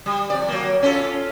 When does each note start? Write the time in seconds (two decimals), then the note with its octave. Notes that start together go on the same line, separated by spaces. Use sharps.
0.06 G3
0.30 F2 D5
0.48 F#3 A#3
0.82 C#4 F4 A4